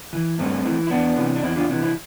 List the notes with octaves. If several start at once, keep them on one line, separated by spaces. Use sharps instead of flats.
E3
G2 A3 C4
E3
E4
E2 B3 D4
C3 E3
D4
E2 C4 E4
D4 F4
C3 E3
C4 E4